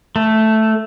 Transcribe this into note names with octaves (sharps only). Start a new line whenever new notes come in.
A3